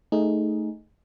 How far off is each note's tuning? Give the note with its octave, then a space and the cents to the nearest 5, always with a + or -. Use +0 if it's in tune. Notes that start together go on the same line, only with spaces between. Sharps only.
A3 +0 D#4 +0 G#4 -5